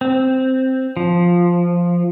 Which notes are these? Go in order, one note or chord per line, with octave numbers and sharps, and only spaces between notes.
C4
F3